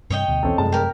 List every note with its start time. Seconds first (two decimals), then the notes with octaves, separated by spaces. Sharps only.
0.10 G2 C3 C#5 D#5 G5
0.28 D2 B2
0.43 B1 E2 E3 C4 C#4 A4
0.58 F1 F#2 G#3 A5
0.72 G4 A#4